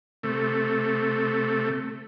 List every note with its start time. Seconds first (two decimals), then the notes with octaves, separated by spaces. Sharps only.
0.23 C3 A3